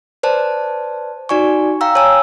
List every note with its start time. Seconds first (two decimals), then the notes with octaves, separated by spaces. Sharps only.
0.23 B4 C5 D5 A5
1.29 D#4 F#4 D5 G#5 C#6
1.81 F5 G5 A#5 E6
1.95 C#5 G#5 A5 E6